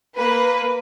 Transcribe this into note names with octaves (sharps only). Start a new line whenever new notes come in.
A#3 B4